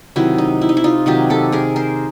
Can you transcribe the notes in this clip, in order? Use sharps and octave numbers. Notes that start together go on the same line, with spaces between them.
C3 D#3 F#3 E4
D#4
E4
D#4
E4
D#4 F4
C3 D#3 F#3 F4 G4
G4 A4
G#4 A#4
A#4 C5